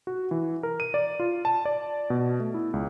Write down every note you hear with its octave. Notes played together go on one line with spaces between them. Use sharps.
F#4
E3
A#4
D#7
D5
F4
A5
D5
B2
A3
E4
C#2